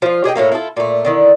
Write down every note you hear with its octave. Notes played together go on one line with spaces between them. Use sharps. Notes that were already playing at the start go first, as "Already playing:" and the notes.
F3 F4
G4 G#4 D#5 G5
A2 G3 A3 A#3
E4 F4 G4 A4
A#2 A3
D3 D#3 E4